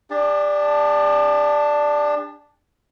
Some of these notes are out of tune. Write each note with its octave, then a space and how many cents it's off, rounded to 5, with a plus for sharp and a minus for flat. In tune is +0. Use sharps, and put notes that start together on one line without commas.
D4 +0 G4 +45 A5 +0